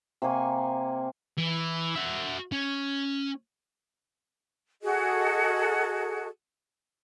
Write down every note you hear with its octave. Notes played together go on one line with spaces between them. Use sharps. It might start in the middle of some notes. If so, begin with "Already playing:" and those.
C3 A#3 G#5 C#6
E3
F#4 E5
C#4
F#4 G#4 A4 D#5